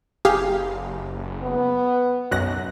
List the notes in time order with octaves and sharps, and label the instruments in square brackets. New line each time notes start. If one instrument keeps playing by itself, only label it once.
[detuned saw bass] F#1 [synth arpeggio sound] G4 G#4 F5
[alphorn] B3
[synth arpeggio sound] B1 F#6 A#6 [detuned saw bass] F#2